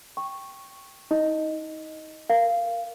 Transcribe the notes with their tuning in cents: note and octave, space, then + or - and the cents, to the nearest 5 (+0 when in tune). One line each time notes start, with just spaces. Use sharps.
G5 +0 C#6 -10
D#4 +30 D#5 +0
A#4 +0 F5 -15